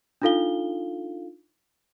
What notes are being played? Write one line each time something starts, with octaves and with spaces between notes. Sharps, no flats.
D4 D#4 F4 A4 F5 G7